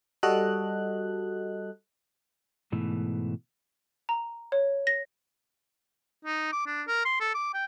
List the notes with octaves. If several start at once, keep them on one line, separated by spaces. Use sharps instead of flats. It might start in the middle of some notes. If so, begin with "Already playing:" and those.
G3 F#4 A4 D#5 F#6
G#2 B2 E3 A3
A#5
C#5
A#6
D#4
D6
D4
A#4
C6
A4
D6
G5